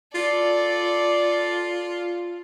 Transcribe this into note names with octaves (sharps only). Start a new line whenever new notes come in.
F4 A4 D5